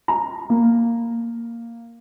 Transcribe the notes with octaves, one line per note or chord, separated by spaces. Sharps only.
A#5
A#3